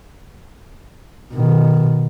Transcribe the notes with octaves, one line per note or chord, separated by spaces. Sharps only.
B2 D#3